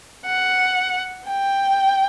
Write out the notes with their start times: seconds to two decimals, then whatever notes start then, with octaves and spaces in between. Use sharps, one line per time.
0.26 F#5
1.28 G5